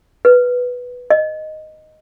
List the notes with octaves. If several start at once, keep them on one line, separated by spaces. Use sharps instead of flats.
B4
D#5